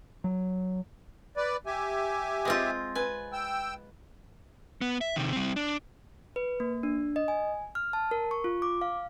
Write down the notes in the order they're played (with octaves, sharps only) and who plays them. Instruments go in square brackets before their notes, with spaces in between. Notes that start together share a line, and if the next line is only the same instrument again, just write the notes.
[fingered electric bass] F#3
[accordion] B4 D5
G4 E5 G#5
[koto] G#3 C4 F4
B4 G#5
[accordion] G5 E6
[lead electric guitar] B3
E5
C3 D#3
G3 C4
D4
[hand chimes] B4
A#3
D4
D#5
G#5
F6
A5
A#4
C#6
F4
D6
F5